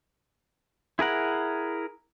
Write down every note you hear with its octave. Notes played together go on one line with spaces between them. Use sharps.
E4 G#4 A#4 F#5